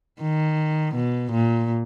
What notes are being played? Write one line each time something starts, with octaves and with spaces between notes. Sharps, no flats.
D#3
B2
A#2